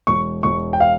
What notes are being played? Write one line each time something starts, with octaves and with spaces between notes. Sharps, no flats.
E1 C#6
E1 C#6
G5
F5